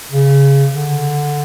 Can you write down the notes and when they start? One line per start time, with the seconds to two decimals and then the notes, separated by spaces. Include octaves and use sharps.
0.12 C#3
0.74 D3